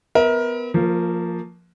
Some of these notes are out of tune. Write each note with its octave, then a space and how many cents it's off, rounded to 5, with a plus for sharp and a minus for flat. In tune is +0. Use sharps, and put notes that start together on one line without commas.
B3 +15 A#4 +20 E5 -35
F3 +0 A#3 -20 A#4 +35